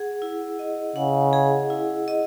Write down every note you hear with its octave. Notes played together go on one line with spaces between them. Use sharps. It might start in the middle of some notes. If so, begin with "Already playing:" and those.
Already playing: G#4 F#5
E4
D#5
C#3 F#5
G#4
E4
D#5